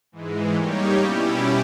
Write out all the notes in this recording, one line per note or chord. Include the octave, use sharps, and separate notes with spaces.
G#2 E3 G#3
G3 A#3 D#4 G4 C#5
B2 G3 C#4 E4 G4